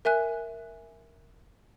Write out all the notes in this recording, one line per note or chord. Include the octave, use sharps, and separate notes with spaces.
A#4 E5 G#5 F#6